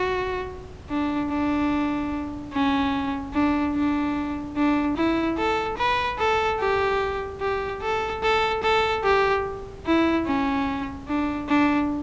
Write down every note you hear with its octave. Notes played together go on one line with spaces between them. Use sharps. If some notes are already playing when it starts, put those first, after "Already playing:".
Already playing: F#4
D4
D4
C#4
D4
D4
D4
E4
A4
B4
A4
G4
G4
A4
A4
A4
G4
E4
C#4
D4
D4